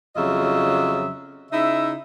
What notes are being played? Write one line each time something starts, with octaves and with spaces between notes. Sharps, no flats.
F2 C#3 F#3 F4 D#5 E5
C#3 D#4 E4 E5